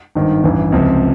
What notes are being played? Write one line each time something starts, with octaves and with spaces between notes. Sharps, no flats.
G#1 G2 D#3
A1 G2 E3
C#2 C3 F3